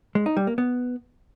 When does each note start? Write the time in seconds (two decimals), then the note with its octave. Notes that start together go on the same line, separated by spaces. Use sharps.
0.15 G#3
0.26 D#4
0.37 G3
0.47 A#3
0.58 B3